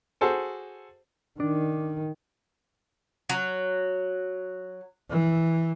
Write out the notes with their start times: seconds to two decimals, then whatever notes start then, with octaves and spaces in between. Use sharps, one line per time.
0.21 F#4 G#4 A4 C5
1.40 D#3 D4
3.29 F#3
5.10 E3